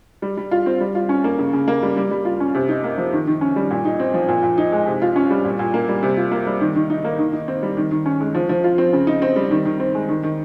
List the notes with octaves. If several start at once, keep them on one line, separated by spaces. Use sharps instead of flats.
G3
G3
F4
C4
G3
F4
C#4
A#3
C#3
C#3
A#3
G3
G3
G3
F4
C#4
C3
D#4
A#3
F3
D#3
D#3
C#4
G3
A#2
D#4
C4
F3
A#2
A#2
D#4
G#3
C3
F4
C#4
G3
A#2
A#2
A#3
G3
C3
F4
A#3
G3
D#3
D#3
D#4
A#3
D#3
D#4
C4
G3
D#3
D#3
C#4
G#3
F3
F3
F4
C4
C#3
D#4
C4
G3
D#3
D#3
C4
G#3
D#3
D#3